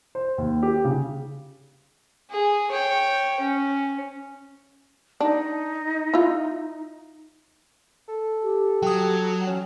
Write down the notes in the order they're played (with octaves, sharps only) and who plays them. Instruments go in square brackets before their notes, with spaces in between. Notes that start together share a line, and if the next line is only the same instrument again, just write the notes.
[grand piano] C5
D#2
G4
C#3
[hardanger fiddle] G#4
C#5 G5
C#4
[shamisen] D4 [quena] D#4
[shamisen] E4 F4
[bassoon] A4
[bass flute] G4
[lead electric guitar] F#3 [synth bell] G5 D#6
[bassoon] C#4